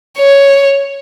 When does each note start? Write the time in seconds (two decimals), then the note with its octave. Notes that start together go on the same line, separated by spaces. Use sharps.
0.18 C#5